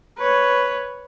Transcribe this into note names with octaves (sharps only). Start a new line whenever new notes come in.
B4 C#5